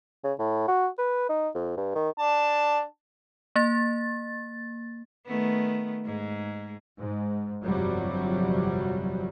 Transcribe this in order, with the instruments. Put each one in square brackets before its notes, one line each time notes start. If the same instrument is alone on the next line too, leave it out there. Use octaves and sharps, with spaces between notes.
[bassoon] C#3
A2
F#4
B4
D#4
F2
G2
D#3
[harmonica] D4 A5
[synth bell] A#3 A6
[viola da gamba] D#3 A3 B3
G#2 G#3
[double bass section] G#2
G1 F2 C3 F#3 G3